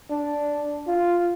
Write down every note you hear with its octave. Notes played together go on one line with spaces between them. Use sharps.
D4
F4